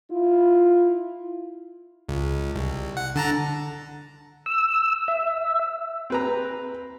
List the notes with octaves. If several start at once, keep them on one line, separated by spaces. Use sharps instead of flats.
E4 F4
C#2
C2
F#5
D3 A5 A#5
E6
E5
C4 B4 A#5